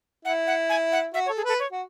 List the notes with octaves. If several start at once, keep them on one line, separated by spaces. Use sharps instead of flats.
E4 F#5
F#5
G#5
F#5
F#4 E5
C#5
A4
G#4
A4 B4
C#5
F#4